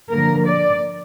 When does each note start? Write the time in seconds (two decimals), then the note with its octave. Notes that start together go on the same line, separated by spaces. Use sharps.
0.10 D3 F3 A#3 A#4
0.47 D5